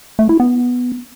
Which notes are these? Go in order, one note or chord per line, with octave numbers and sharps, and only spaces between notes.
A3
E4
B3